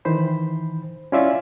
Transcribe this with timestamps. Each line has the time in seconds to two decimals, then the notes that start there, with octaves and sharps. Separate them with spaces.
0.05 D#3 E3 C5 B5
1.12 C#4 E4 F4 D5 E5 F5